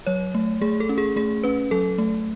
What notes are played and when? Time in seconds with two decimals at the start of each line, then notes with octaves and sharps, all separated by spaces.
0.07 F#3 C#5
0.35 A3
0.62 A3 G#4
0.80 A4
0.89 C#4
0.98 G#4
1.16 A3 G#4
1.44 C#4 B4
1.71 F#3 A4
1.98 A3